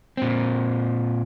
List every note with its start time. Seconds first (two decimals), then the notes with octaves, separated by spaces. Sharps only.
0.17 A#2 C4